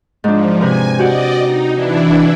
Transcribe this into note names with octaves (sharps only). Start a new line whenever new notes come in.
G#2 F3 D4
C3 B4 G#5 A#5
F#4 G4 D5 D#5 F#5
D#4
E3 D4 E4